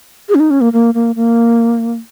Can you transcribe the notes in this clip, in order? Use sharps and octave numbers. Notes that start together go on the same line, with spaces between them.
G#4
C#4
D#4
C#4
A#3
A#3
A#3
A#3